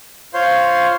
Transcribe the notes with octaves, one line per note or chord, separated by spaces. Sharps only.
F4 C5 C#5 F5 C6